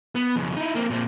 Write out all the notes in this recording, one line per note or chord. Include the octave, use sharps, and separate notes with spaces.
B3
F2 C#3
D#4 E4
A#3 C4
A#2 C4